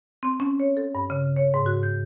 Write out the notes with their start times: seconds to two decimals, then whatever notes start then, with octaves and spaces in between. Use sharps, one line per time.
0.23 C4
0.40 C#4
0.60 C#5
0.77 A4
0.95 G2
1.10 C#3
1.36 C#5
1.54 G#2
1.66 F#4
1.83 G6